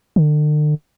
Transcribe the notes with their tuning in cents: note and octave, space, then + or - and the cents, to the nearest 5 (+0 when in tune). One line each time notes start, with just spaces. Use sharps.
D3 +40